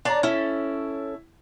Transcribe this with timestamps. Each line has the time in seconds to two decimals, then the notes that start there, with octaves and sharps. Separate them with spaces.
0.05 D4 C#5 D5 A5 A#5
0.23 C#4 E4 A4